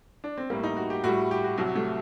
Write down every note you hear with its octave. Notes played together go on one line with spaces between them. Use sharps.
D4
C4
A2 G3 A#3
D#4
F#4
G4
A2 G3 F#4
G4
F#4
C2 C3 F#3 F#4
A3